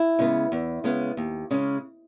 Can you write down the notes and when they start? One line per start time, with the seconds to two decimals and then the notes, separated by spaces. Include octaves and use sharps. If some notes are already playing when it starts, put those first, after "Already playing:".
Already playing: E4
0.19 C#3 G#3 B3
0.52 E2
0.84 C#3 G#3 B3
1.17 D#2
1.51 C#3 G#3 C#4